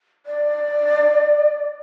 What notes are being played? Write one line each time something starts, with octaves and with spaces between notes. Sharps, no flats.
D5